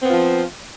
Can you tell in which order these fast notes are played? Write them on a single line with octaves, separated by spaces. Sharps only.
C4 B3 F4 F3